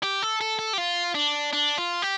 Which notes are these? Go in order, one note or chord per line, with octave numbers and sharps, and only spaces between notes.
G4
A4
A4
A4
G4
F4
D4
D4
F4
G4